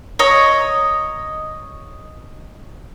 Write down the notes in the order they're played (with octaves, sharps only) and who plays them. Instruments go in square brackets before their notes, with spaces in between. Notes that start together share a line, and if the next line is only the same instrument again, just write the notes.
[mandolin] C#5 D#5 A#5